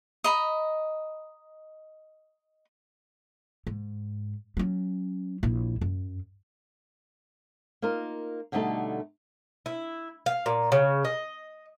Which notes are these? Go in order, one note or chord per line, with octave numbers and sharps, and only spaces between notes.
D#5 A#5 B5
G#2
F#3 C#4
A#1 E4
F#2
A#3 D#4 F4 A#4
B2 D3 G3 A3 D#4 A4
E4
F5
A#2
C#3
D#5